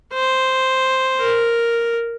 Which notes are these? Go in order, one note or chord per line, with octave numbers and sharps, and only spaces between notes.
C5
A#4